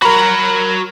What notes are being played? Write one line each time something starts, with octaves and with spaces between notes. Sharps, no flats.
F#4 A#4 A#5 B5